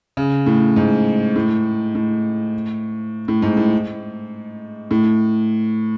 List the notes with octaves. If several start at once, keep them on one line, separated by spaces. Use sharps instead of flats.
C#3
A2
G#2
A2
A2
A2
G#2
A2
A2